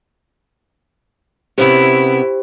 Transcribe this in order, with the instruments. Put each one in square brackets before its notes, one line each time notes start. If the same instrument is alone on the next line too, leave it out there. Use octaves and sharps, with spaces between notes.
[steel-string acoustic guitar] C3 B3 C#4 [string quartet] E4 [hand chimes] G4 C5